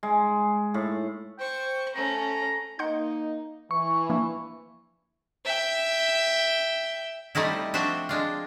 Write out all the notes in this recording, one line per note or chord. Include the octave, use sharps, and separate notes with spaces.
G#3
A2
C5 G5 C#6
A3 C#4 A#5
A#3 D#4 F#5 C6 G6
E3 C#6
F3 A#3 D4
E5 G5
G3 A3 C4 D#4 E4
F3 C4 D4 F#4 C5 E5
G#3 D4 F4